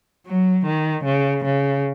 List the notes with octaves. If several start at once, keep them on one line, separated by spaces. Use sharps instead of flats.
F#3
D#3
C#3
C#3